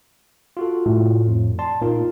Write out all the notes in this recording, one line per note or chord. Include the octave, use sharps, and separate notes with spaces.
F4 F#4 A4
A2
F2
D5 A5 C6
A#2 A#3 D#4 F4